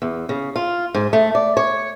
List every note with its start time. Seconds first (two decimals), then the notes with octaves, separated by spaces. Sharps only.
0.02 E2
0.29 C#3
0.56 F4
0.94 G#2
1.13 A3
1.35 D5
1.57 C#5